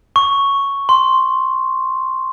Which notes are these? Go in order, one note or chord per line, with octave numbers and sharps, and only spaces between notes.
C#6
C6